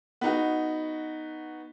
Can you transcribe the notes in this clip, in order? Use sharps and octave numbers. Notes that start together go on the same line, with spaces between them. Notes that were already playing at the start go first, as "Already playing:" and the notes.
B3 D#4 F#4